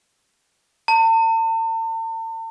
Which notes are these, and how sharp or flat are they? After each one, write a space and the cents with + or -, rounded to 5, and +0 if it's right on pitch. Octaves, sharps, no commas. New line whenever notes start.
A5 +45